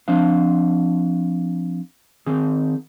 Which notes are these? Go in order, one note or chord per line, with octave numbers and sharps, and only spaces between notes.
F3 C4 D4 F5
D#3 C4 G#4